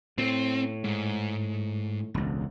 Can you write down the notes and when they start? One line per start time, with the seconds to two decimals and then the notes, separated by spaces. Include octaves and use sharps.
0.18 A2 C4
0.84 G#2
2.14 E1 C#2